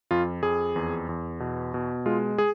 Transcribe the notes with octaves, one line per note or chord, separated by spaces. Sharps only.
F2 F4
F2 G#4
E2
E2
B2
B2
G#3 F4
G#4